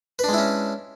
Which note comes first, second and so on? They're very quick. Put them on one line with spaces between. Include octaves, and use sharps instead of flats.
B4 D4 G#3 E4 C#4